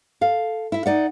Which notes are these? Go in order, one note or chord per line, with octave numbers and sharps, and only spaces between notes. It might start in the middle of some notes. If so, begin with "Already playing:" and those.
A4 F5
E4 E5
D#4 D5 F#5